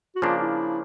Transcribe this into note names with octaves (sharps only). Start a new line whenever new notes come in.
F#4
C#3 F3 A#3 D4 F4
E4